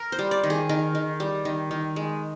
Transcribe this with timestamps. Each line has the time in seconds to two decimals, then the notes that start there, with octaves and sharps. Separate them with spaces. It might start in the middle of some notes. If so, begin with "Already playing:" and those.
Already playing: A#4
0.12 C5
0.19 G3
0.31 D5
0.43 D#3
0.50 G#4
0.69 D#3 A#4
0.95 D#3
1.20 G3
1.45 D#3
1.71 D#3
1.96 G#3